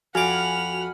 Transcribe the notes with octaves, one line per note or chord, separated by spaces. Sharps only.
F2 F#4 F#5 G#5 B5 D6 F6 F7